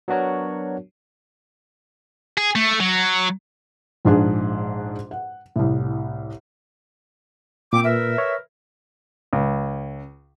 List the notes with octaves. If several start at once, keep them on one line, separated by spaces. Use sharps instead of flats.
F#3 B3 D4 F#4 A#4 C#5
G#4
A3
F#3
A#1 G#2 D4 G#4
F#5
C2 A2
A#2 C4 D6
A#4 B4 E5
C#5
C#2